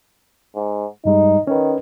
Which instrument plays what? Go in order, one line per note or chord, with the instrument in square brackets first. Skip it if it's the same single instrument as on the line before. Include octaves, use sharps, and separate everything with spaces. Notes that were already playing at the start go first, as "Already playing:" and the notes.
[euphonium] G#2
[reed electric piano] G2 G3 G#3 [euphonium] D#4
[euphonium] D#3 [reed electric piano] C#4 B4